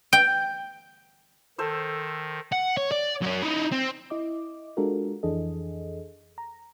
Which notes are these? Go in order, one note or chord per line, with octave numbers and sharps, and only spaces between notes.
G5
D#3 A4 C5 E6
F#5
C#5
D5
F#3 C#4
D#4 E4
C4
E4 D#5 D6
G#3 D4 F4 F#4 A4 A#4
F2 E3 D4 G#4 A4 D#5
A#5